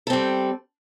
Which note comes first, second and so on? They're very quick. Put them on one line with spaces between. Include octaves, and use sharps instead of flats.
A4 C4 G3